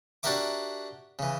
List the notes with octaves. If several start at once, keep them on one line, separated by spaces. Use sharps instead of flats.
D4 F#4 G4 A#4 E5 D6
C#3 E3